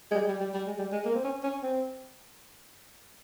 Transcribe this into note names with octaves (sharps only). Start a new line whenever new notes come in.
G#3
G3
G3
G3
G3
G#3
G3
G#3
A#3
C4
C#4
C#4
C4